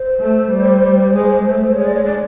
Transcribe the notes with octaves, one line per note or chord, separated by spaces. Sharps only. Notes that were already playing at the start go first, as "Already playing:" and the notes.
Already playing: C5
A3
G3
G#3
A3
G#3 C#5
D5
C#5
D5